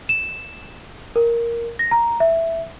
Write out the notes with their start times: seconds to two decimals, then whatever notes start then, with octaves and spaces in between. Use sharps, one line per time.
0.09 E7
1.16 A#4
1.79 A#6
1.91 A#5
2.20 E5